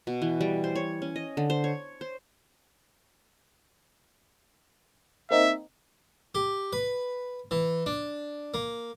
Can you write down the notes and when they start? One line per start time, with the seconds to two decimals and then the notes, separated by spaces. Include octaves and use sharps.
0.07 B2
0.22 E3
0.41 G3
0.64 C5
0.76 C#5
1.02 C#4
1.16 D#5
1.37 D3
1.50 C5
1.64 C#5
2.01 C5
5.31 A#3 C4 D#4 E5
6.35 G4
6.73 B4
7.51 E3
7.86 D4
8.54 A#3